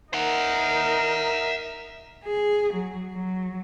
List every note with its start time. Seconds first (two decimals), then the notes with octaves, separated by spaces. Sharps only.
0.14 D#4 A#4 E5 F#5
2.25 G#4
2.73 F#3
3.12 F#3